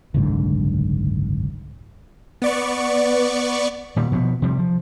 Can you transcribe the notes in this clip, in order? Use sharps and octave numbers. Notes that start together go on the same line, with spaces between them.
F#1 C2 G#2 D3
B3 D5 C#6
A#2 D#3 G3
B2 F3 B3
C3 F3 G3
F3